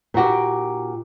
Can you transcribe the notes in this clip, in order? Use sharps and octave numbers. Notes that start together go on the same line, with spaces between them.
A#2 D#4 F#4 G4